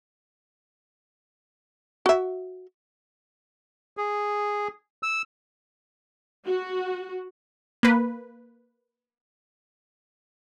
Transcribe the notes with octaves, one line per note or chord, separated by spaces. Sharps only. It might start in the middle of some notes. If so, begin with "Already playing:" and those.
F#4 E5
G#4
E6
F#4
A#3 B4